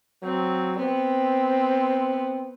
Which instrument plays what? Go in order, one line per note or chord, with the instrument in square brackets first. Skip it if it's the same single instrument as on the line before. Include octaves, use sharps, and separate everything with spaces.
[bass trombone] F#3 [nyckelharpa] C4
[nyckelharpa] B3 [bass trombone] C4